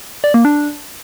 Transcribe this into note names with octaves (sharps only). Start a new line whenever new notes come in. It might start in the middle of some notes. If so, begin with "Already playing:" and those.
D5
A#3
D4